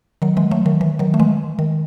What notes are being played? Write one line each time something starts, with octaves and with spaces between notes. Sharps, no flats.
D#3 F#3
E3 G#3
F#3 A3
D#3
E3
D#3 F#3
A3
E3 G#3
D#3